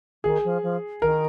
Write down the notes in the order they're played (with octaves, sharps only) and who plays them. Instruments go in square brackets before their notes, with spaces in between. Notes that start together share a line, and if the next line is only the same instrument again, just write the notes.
[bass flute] D#3 [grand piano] G#4
[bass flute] F3
F3
[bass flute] D#3 [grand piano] A#4